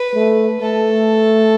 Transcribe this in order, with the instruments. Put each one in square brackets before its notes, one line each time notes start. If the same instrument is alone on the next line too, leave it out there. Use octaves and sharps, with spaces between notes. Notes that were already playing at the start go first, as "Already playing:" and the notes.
Already playing: [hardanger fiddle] B4
[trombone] A3
[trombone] A3 [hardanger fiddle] A4